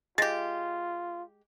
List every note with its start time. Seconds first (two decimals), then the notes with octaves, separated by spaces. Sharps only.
0.18 G#3 F4 G4 A6 A#6